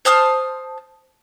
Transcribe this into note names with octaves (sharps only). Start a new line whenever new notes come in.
C5 A5 D#6 F6